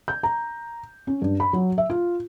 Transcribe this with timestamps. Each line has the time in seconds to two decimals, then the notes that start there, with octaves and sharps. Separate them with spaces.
0.08 G6
0.23 A#5
1.07 C#4
1.22 G2
1.40 B5
1.53 F#3
1.78 E5
1.90 F4